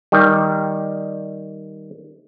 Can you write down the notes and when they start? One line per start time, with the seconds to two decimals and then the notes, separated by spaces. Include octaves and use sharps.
0.12 D#3 G3